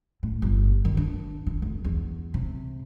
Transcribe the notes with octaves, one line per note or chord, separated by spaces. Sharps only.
A2
G1
D#3
D4
D3
F1
E2
C3